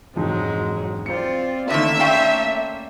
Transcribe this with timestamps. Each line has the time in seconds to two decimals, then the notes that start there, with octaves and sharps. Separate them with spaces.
0.16 E1 F2 G#2 F#3 G#3
1.06 C4 F4 C5 D5 C#7
1.70 D3 D#3 A3 A#3 C#4 E5
2.00 D5 F5 G5 C6 C#6